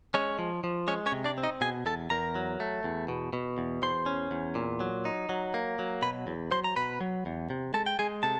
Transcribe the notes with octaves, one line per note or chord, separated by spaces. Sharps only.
G#3 C#4 C#5
F3
F3
G#3 C#4 C#5
C#4 C#5
C3
D4 D5
C4
D#4 D#5
B2 G#4 G#5
E2 A4 A5
E2 A#4 A#5
F#3
A3
E2
B2
B2
E2
E2 C5 C6
C#4
E2
A#2
F#3
D#4
F#3
A#3
F#3
B2 B4 B5
E2
F#3 C5 C6
A#5
B2 B4 B5
F#3
E2
C3
G#3 A4 A5
G5
G#3 G#4 G#5
C3 A4 A5